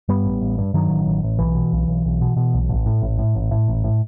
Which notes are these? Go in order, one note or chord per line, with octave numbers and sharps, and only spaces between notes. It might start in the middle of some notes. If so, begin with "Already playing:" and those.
G2 G3 B3
A1
A1
G2
G2 D#3 F#3
A1
A1
A1
B1 E3
B2
B1
B1
B1
B2
B2
B1
A1
A2
A1
A2
A1
A2
A1
A2